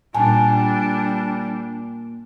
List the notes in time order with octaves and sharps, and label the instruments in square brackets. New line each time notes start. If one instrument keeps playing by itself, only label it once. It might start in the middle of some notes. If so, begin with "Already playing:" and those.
[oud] A#2 [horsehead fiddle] G3 D4 [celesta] G#5 A5